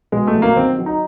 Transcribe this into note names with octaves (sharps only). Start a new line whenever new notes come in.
B2 G#3
A3
F#3
A#3
D#3 C4
F#3
D#4